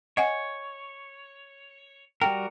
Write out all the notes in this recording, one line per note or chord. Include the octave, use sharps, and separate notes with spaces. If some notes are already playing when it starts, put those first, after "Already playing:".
C#5 D#5 F#5 G#5
G3 F#4 A#4 G5